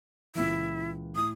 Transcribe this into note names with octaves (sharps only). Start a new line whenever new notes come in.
C#2 A#2 E3 E4
A2 E4 D#6